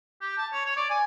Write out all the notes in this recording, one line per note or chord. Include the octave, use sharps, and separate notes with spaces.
G4
A5
C#5
C#5
D5
G#5